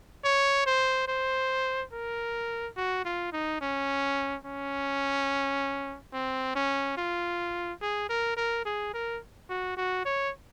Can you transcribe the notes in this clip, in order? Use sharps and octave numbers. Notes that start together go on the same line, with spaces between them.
C#5
C5
C5
A#4
F#4
F4
D#4
C#4
C#4
C4
C#4
F4
G#4
A#4
A#4
G#4
A#4
F#4
F#4
C#5